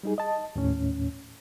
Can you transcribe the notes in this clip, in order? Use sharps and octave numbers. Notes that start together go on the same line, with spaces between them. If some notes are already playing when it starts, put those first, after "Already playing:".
G3 D#4 G#4
D#5 A5
D#2 A2 C#4